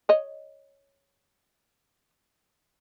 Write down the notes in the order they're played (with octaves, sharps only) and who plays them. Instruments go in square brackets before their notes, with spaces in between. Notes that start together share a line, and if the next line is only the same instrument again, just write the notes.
[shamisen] C#5 D#5